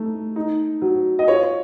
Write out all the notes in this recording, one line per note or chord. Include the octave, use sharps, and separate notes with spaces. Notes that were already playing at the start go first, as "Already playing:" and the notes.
Already playing: A3 D#4
D#4
F#3
D#5
F4 C#5